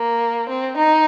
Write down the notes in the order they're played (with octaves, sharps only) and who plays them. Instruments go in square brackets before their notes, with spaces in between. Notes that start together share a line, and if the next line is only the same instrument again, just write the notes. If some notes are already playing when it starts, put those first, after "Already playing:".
Already playing: [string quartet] A#3
C4
D#4